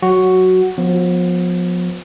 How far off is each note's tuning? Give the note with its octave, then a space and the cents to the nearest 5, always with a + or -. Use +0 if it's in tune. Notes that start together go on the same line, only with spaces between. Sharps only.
F#3 +0 F#4 +5
F3 +35 B3 +5